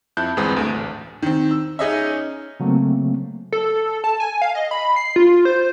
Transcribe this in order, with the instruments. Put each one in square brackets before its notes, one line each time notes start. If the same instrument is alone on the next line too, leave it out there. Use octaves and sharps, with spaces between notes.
[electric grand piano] F2 E4 A5 F#6 G6
G1 E2 G#3 C4 B4 D#6
D2 A3
A1
[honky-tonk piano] D#3 C4
E6
[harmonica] C#4 D#4 [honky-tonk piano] G#4 D#5 E5
[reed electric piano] C#3 F#3 A3 A#3 C4
[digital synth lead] A4
A5
G#5
F5
D#5
B5
C7
F4
C5